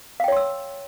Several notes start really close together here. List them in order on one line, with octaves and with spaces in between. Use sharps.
F5 G5 C#5 C6 E6